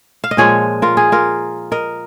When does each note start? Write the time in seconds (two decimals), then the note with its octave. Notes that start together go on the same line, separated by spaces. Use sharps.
0.24 F5
0.31 D#5
0.37 A#2 F3 G#3 G#4 C#5
0.82 F4 A#4
0.97 G#4
1.12 F4 A#4
1.72 A#4 D#5